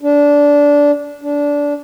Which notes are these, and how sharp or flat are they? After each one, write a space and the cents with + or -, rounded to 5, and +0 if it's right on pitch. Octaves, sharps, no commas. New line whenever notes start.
D4 -15
D4 -20